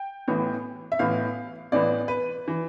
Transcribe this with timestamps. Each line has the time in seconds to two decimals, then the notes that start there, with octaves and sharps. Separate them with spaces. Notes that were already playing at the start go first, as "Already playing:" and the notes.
Already playing: G5
0.28 A1 A2 E3 B3
0.92 E5
0.99 A1 A2 E3 B3 F5
1.72 A1 A2 E3 B3 D5
2.08 B4
2.48 E3